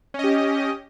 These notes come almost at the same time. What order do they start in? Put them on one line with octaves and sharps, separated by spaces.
C#4 D#5 G4